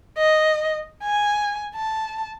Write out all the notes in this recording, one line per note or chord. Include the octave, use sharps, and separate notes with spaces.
D#5
G#5
A5